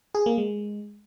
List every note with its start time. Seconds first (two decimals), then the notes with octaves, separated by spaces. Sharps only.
0.15 G#4
0.26 A#3
0.38 G#3